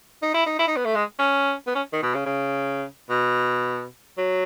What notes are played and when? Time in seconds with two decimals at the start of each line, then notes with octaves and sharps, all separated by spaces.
0.22 D#4
0.34 E4
0.46 D#4
0.59 E4
0.67 D#4
0.76 B3
0.85 A3
0.95 G#3
1.19 C#4
1.67 B3
1.75 C#4
1.93 D#3
2.03 B2
2.14 C#3
2.26 C#3
3.10 B2
4.18 F#3